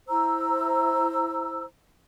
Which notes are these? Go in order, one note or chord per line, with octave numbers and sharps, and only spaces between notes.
E4 C5 A#5 E6